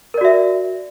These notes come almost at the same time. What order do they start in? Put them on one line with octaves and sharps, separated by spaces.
A#4 D5 F#4 E5